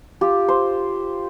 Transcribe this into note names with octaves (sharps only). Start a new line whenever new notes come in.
F4 G4
C5